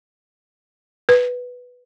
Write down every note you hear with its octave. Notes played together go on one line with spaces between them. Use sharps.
B4